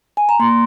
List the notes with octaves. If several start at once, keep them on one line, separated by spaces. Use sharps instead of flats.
G#5
A#5
A#3 C6